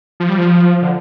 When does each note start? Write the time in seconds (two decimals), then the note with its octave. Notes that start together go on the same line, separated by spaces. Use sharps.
0.20 F3
0.29 G3
0.38 F3
0.82 D3